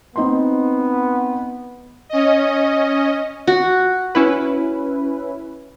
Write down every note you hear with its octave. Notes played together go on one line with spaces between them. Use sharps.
B3 C4 D#4 C6
C#4 D#5
F#4
C#4 E4 B4